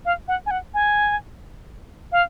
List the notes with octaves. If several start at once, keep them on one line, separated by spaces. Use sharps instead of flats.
F5
F#5
G#5
F#5
G#5
F5